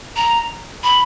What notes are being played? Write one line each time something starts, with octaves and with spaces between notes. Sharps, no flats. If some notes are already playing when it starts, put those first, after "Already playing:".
A#5
B5